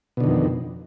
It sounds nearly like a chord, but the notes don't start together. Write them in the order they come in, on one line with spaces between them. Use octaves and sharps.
B2 D3 D#3 F2